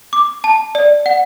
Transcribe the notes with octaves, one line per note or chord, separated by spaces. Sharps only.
D6
A5
D5
F#5